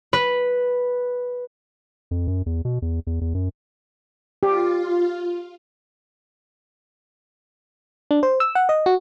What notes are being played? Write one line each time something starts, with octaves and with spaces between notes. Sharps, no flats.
B4
F2
F#2
E2
B2
E2
E2
E2
F#2
F4 G4
D4
C5
E6
F#5
D#5
F#4